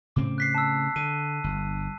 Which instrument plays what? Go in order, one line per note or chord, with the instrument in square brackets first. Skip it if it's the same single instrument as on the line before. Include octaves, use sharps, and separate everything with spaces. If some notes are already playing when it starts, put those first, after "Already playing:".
[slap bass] A2 C#3 C4 [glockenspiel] D6
[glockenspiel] F#6 B6 C7
A5 E6
[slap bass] D3 [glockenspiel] D#7
[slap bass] G1